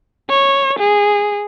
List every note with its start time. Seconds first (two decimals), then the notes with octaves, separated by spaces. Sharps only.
0.30 C#5
0.79 G#4